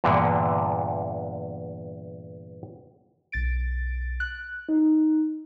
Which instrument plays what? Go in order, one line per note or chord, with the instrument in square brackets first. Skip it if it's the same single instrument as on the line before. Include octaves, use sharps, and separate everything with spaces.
[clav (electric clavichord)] E2 G2 A#2 D3
[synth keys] B1 A6 D7
F#6
D#4